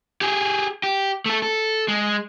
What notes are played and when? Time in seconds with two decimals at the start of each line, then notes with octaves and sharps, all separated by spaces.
0.21 G4 G#4
0.84 G4
1.26 A3 A4
1.42 A4
1.88 G#3